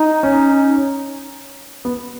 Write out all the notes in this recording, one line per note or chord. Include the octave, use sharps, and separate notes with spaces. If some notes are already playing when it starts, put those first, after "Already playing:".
Already playing: D#4
C#4
B3